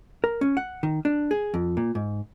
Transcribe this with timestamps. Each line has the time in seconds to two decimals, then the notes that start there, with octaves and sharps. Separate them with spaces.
0.24 A#4
0.41 C#4
0.57 F#5
0.83 D#3
1.05 D4
1.31 G#4
1.54 F2
1.77 A#2
1.95 G#2